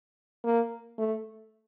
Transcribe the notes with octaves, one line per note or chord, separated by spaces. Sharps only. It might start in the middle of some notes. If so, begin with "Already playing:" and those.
A#3
A3